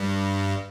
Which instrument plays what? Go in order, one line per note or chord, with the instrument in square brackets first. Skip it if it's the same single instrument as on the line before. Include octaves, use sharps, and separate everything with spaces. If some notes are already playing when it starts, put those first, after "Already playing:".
Already playing: [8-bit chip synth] G2